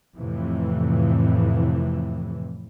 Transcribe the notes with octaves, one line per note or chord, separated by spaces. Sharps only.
F2 A2 C3 E3